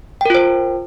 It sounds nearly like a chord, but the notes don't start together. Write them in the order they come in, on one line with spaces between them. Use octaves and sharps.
G5 A#4 F4 C5